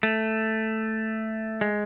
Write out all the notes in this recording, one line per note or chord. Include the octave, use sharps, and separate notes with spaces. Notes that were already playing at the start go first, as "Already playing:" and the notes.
A3
G#3